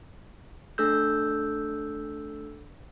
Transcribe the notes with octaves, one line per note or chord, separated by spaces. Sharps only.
A3 D4 A4 E6 G6